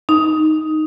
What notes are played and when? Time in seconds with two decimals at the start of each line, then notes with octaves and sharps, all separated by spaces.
0.09 D#4